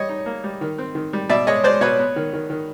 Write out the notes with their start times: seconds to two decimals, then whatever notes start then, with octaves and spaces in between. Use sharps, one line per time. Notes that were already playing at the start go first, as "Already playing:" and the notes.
Already playing: G3 C#5 D#5
0.09 D#4
0.26 A#3
0.44 G3
0.61 D#3
0.78 C4
0.95 D#3
1.13 G3
1.29 B2 D5 E5
1.47 G#3 C#5 D#5
1.64 G#3 C5 D5
1.81 B2 B4 C#5
1.99 B3
2.16 D#3
2.33 D#3
2.50 D#3